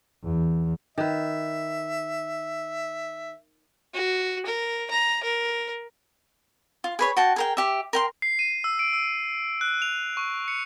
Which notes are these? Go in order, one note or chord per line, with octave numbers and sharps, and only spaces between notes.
E2
D#3 B4 E5
F#4
A#4
A#5
A#4
F4
G#4 B4 C#5
F#4 G5 A5
G#4 A#4 G5
G4 E5
A#4 G5 C6
C7
D#7
E6
D7
E6
F#6
F7
C#6
C#7